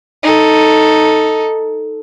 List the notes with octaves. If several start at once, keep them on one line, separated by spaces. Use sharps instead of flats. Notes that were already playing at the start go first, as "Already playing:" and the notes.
D#4 A4